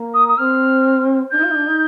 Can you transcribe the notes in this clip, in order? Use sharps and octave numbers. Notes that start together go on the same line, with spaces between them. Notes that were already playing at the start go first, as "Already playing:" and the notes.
Already playing: A#3
D#6
D#6
C4 F6
D4 G6
D#4
F4
D#4
D4
D#4